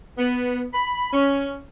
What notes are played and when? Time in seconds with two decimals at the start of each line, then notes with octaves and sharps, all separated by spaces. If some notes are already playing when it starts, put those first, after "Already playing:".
0.18 B3
0.73 B5
1.13 C#4